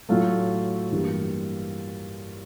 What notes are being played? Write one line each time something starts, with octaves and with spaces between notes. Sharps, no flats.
A2 F#3 A3 F4
G2 E3 G3 A#3